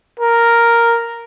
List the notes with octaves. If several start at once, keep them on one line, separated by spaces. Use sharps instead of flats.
A#4